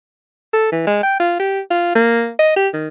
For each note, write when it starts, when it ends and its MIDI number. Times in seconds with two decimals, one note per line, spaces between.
0.53 0.69 69
0.72 0.84 52
0.87 0.99 56
1.03 1.18 79
1.20 1.36 65
1.40 1.60 67
1.71 1.92 65
1.95 2.31 58
2.39 2.52 75
2.56 2.68 67
2.73 2.88 51